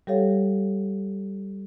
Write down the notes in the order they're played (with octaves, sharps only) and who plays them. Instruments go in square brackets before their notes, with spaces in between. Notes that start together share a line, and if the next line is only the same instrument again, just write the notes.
[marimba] G3 G4 A4 C#5 F5 F#5